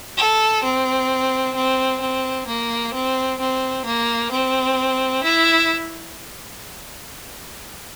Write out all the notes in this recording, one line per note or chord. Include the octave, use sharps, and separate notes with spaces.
A4
C4
C4
C4
A#3
C4
C4
A#3
C4
E4